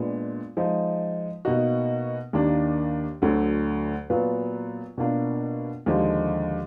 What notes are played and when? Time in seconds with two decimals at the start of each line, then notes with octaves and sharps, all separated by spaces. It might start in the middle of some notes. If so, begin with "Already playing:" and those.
Already playing: A#2 G#3 B3 D4
0.57 F3 G#3 D#4
1.45 B2 A#3 D#4 F#4
2.33 D#2 D#3 A#3 D4
3.22 D2 D3 F#3
4.10 A#2 F#3 B3 F4 B4
4.98 B2 A#3 D4 F4 A#4
5.86 D#2 D3 F3 G#3 D#4